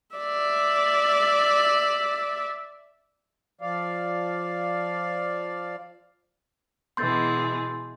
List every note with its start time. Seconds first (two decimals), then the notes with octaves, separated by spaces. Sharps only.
0.16 D5 E5
3.61 F3 D5 F5
6.97 B2 E3 G#3 C6 G6 A6